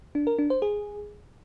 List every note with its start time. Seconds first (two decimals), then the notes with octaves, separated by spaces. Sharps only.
0.15 D4
0.27 A#4
0.39 D4
0.50 C5
0.62 G#4